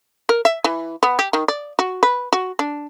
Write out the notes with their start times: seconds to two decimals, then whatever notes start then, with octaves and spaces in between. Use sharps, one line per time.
0.29 A#4
0.45 E5
0.64 E3
1.03 B3
1.19 G4
1.33 D#3
1.48 D5
1.79 F#4
2.03 B4
2.33 F#4
2.59 D4